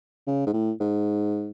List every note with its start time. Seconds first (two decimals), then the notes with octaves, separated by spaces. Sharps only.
0.27 C#3
0.47 G#2
0.53 A2
0.80 G#2